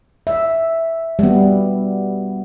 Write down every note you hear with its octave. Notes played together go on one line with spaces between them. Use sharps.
E5
G3 B3